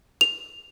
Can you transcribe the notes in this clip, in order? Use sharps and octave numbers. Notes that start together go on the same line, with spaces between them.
F7